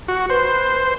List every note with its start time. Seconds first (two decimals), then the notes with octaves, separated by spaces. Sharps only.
0.08 F#4
0.30 B4 C5